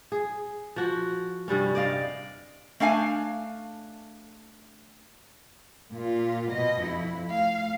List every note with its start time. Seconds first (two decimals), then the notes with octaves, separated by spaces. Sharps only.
0.12 G#4
0.76 F3 F#4
1.48 G2 C3 G3 C#4
1.75 D5 D#5 F5
2.80 A3 D4 F5 G#5
5.92 A#2 F4
6.52 B2 D#5
6.81 F2 E4
7.27 A3 F5